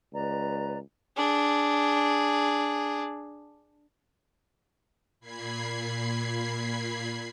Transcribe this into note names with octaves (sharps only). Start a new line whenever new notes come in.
C#2 B4 D5 A#5
D4 G#4
A#2 B5 G#6 C7